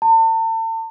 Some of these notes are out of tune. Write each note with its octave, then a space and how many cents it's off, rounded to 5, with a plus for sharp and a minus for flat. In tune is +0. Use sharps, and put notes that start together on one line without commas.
A5 +40